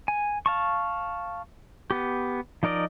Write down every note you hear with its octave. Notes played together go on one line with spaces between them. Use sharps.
G#5
F5 A5 C#6
B3 G4
F3 D#4 A#4 D5 D#5